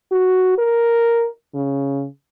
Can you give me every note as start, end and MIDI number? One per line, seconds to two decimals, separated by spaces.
0.12 0.58 66
0.58 1.29 70
1.55 2.07 49